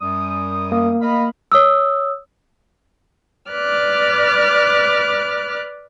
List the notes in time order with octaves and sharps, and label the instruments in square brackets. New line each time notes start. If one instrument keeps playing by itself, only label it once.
[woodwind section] F#2 G3 D#6
[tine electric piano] A#3
[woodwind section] D#5 F5 B5
[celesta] C#5 D#6 E6
[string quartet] B4 D5 D6 F6 F#6